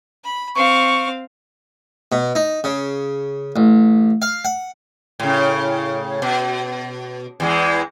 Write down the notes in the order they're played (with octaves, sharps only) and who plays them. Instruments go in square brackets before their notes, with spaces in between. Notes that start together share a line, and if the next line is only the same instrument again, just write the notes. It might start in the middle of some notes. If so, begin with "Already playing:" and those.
[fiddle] B5
[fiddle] C4 F5 [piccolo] C#6
[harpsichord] B2
D#4
C#3
A1
F5
F#5
[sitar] A2 C#3
B2
E2 E3 G#3